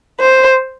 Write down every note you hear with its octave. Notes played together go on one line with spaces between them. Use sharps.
C5